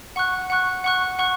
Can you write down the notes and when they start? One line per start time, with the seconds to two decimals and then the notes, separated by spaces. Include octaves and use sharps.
0.16 F#5 C#6 F#6
0.50 F#5 C#6 F#6
0.84 F#5 C#6 F#6
1.19 F#5 C#6 F#6